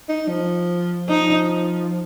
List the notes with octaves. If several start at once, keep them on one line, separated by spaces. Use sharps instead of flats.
D#4
F3
F3 D#4